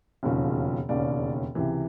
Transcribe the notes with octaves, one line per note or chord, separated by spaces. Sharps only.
E1 D#2 C#3 F3
E1 D#2 C#3 D5
C#2 C3 E3